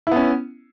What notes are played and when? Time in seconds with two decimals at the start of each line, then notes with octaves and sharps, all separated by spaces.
0.07 E4
0.11 B3
0.16 C#4